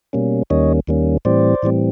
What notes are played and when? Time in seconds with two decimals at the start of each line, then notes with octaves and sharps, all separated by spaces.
0.13 B2 G3 A#3 C#4
0.50 D#2 D#3 G3 A#3 C#4 C#5 D#5
0.87 D#2 D#3 G3 A#3 C#4
1.25 A2 E3 G3 C4 C5 D5
1.63 A2 E3 G3 C4